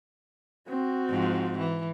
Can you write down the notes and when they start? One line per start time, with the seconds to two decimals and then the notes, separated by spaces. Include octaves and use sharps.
0.69 C4 F#4
1.10 G#2 F3
1.58 E3